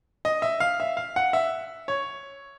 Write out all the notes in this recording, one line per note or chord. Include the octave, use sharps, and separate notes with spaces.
D#5
E5
F5
E5
F5
F#5
E5
C#5